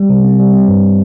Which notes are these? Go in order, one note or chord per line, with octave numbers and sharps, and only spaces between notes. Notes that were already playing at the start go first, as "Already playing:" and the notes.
Already playing: G3
C3
C4
G3
C4
G2